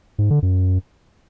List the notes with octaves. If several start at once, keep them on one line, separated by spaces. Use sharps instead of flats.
G#2
D3
F#2